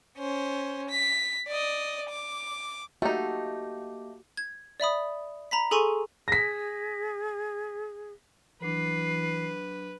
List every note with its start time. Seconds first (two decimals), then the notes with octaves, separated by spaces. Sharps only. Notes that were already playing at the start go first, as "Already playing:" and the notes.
0.18 C#4 C5
0.89 B6
1.47 D5 D#5
2.09 D6
3.02 A3 A#3 D#4 F#4 G4
4.37 G#6
4.80 D5 E5 B5 D#6
5.51 A#5 B5 B6
5.71 G#4 A4 G#5 C6 C#6 D#7
6.28 G#4 A#6 B6
8.62 E3 F#3 D4 B4 C7